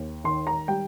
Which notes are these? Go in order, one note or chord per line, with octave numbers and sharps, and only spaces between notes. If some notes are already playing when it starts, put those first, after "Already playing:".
Already playing: D#2
D#3 C6
A#5
G3 G5